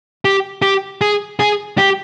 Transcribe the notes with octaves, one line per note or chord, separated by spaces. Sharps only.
G4
G4
G#4
G#4
G4